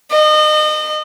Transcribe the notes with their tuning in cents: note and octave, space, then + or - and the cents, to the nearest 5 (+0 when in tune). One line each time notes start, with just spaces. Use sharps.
D#5 -30